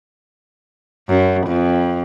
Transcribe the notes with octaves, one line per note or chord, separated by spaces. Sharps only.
F#2
F2